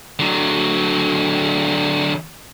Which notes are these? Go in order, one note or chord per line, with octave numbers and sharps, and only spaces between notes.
D3 F#3